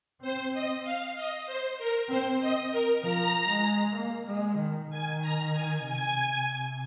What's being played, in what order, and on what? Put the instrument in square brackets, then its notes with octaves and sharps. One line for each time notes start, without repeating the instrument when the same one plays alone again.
[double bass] C4 [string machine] C5
[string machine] D#5
F5
D#5
C5
A#4
[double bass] C4 [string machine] C5
[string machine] D#5
A#4
[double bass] F3 [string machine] A#5
[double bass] G#3
A#3
G#3
D#3
[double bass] D#3 [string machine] G#5
[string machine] A#5
G#5
[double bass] C3 [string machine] G#5